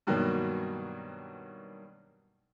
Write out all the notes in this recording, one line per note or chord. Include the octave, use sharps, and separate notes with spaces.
G2 B2 D#3 F#3 A#3